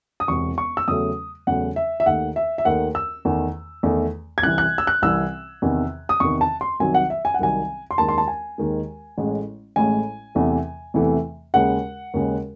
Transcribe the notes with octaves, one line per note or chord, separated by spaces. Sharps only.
D#6
E1 E2 C3 C#6
C#6
E6
E2 C#3 F#3 A3 D#6
E2 C#3 F#3 A3 F#5
E5
E5
D#2 D#3 A3 F#5
E5
E5
D#2 D#3 A3 F#5
E6
E2 D#3 A3
E2 D#3 A3
G#6
C2 C3 E3 F#6
F#6
E6
F#6
C2 C3 E3 E6
E2 C3 D#3
D#6
E2 C3 D#3 C#6
A5
C6
C2 C3 D#3 F#3 G#5
F#5
E5
G#5
F#5
C2 C3 D#3 F#3 G#5
C6
D#2 D#3 G#3 A5
C6
A5
G#5
D#2 D#3 G#3
A1 A2 G#3
A1 A2 G#3 G#5
E2 C3 E3 A3
E2 C3 E3 A3
D#2 C#3 G#3 F#5
D#2 C#3 G#3